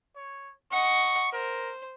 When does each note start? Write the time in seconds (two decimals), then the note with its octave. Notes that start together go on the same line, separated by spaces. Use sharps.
0.16 C#5
0.71 D#5 F#5 C#6
1.33 A#4 C5